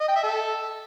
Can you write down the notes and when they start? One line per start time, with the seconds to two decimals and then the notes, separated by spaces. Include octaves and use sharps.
0.01 D#5
0.08 G5
0.16 E5
0.23 A4